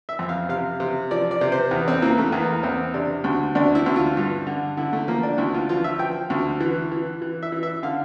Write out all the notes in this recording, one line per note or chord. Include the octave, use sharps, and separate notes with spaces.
E5
F2
F5
C3 F5
C3
F3 D5
D5
C3
C5
E2
C4
E3 A#3
A3
E2 A#3
E2 C4
C3 D4
D2
D2 D4
E4
D2
F4
G2
D3
D3 E4
A3
F3 A#3
D4
D2 E4
F4
F3 F4
E5
F3 G5
D2
E3
E3
E3
E5
E3
E5
D3 F5